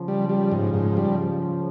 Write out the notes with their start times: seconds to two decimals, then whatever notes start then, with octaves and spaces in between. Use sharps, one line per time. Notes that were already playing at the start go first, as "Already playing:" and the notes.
Already playing: C#3 F3
0.08 G3
0.29 G3
0.52 G#2
0.74 G#2
0.97 G3